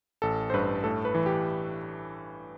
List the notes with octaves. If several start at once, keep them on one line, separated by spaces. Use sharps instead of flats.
A1 A4
C5
G2 B4
A2 A4
B4
E3
G4